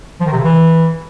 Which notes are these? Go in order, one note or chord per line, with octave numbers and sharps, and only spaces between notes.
F3
D#3
C3
C#3
E3